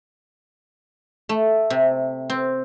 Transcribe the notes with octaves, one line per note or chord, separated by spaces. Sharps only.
A3
C3
C4